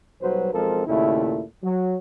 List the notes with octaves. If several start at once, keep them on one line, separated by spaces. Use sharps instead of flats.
B1 F#3 G3 B4 C5
B1 F3 G#3 C4 A4 A#4
D#2 A#2 C#3 A3 E4
F#3